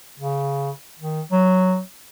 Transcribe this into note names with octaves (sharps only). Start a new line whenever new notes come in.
C#3
D#3
F#3